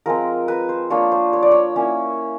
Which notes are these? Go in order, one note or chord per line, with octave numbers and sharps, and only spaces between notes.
F3 G#3 C4 A#4
B4
C5
F3 A#3 D4 F4 C#5
C5
C#5
D5
C#5
A#3 C#4 E4